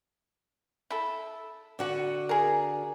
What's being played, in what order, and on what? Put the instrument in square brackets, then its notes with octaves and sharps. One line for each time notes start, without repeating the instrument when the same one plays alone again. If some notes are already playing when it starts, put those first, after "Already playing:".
[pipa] E4 A4
[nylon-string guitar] D3 F#4 F#5
[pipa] G#4 A#4